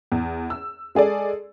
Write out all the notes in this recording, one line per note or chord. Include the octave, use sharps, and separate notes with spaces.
E2
E6
G#3 G#4 A4 D5